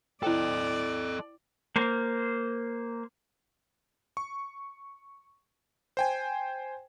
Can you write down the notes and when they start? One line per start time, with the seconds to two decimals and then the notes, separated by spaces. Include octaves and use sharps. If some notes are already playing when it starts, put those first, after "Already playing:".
0.23 E4 A4 C5 D5 D#5 G5
1.76 A#3 C5
4.17 C#6
5.97 C5 G5 G#5